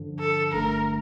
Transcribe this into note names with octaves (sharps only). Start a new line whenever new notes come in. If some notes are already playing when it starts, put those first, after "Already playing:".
Already playing: G2 D3 F3
A4
G1 G2 D3 A3 A#4